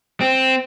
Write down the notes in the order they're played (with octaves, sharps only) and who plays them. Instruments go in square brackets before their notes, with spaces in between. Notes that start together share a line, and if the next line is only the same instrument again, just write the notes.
[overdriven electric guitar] C4